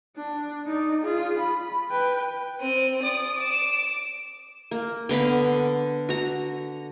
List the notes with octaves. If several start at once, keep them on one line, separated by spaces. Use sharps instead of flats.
D4
D#4 D5
F4 G#4
B5
B4 G5
C4 D#7
D5 D#6
D6 E7
A#3
D3 B3 F5 B5
F#4 A#5